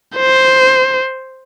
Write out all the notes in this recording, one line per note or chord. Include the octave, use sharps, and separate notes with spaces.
C5